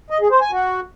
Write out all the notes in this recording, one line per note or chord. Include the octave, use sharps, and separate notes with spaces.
D#5
G#4
C5
G#5
F#4